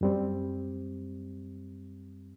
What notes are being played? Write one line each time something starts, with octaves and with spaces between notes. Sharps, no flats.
F#2 G3 C4